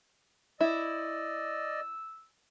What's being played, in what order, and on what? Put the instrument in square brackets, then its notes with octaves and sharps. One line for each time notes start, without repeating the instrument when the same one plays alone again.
[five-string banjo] E4 [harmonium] D5 D#5 [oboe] E6